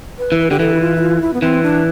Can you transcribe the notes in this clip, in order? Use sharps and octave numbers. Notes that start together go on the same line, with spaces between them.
B4
E3
B4
D3 G4
E3 A4
E4
F4
E4
F4
E4
B3
E3 C4
D4